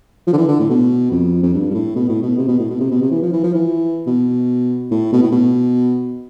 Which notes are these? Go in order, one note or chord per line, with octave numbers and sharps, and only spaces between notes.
F3
D3
E3
D3
A2
B2
F2
F2
G2
G2
A2
B2
A2
B2
C3
B2
A2
B2
C3
B2
C3
E3
F3
E3
F3
E3
B2
A2
B2
A2
B2